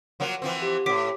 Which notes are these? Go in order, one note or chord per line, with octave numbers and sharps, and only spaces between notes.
F3 F#3 A#3
E3 F3 C4
G4
F2 A2 D6 B6 D7